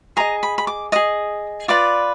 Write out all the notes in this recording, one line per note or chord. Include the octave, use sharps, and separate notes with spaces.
G#4 D#5 A#5
B5
B5
D6
G#4 D#5 D#6
F4 B4 D5 D6